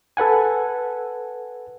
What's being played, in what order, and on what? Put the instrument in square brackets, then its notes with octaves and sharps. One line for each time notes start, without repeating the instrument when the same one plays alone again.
[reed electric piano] A4 B4 F#5 G#5